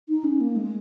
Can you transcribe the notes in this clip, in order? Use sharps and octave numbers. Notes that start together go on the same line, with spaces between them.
D#4
C#4
A#3
G#3